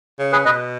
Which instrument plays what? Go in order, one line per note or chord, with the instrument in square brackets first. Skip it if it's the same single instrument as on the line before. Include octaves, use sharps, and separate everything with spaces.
[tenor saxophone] C#3
[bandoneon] G#4 B4
[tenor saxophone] B2 [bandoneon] B4 D#5